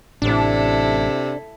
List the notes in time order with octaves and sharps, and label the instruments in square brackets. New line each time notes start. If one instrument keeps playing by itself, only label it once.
[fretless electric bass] A1 A2 [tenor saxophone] C3 [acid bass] D4 [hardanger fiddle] E4 A4